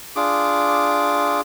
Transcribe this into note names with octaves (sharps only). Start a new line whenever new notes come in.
D4 F4 G#4 D6